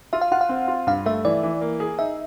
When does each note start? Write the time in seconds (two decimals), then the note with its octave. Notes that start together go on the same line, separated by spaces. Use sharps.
0.13 F4 E5
0.21 F5
0.32 F4 F#5
0.41 F5
0.49 C4
0.68 F4
0.87 G2 F5
1.06 A3 E5
1.25 E3 D5
1.43 E3
1.61 A#3
1.80 G#4
1.99 D#4 E5